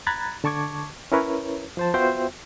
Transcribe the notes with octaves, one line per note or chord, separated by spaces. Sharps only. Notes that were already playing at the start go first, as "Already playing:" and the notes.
A#5 B5 F#6 G#6 A6
D3 A5 C#6 D6 G#6
C#4 E4 A#4 B4 C#5
F3 C5 A5
B3 F4 F#4 C5 E5 G5